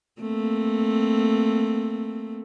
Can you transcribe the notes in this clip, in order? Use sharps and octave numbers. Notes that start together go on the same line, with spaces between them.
A3 A#3 C4